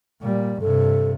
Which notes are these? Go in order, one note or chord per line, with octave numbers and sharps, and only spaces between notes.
A#2 G3
G2 C3 A4